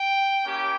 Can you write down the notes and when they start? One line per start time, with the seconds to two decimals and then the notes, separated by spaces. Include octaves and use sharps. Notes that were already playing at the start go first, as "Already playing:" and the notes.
Already playing: G5
0.45 A#3 C#4 E4 G4